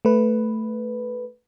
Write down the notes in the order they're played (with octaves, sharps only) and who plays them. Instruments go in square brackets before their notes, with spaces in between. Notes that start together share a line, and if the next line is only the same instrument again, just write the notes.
[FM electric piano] A3 B4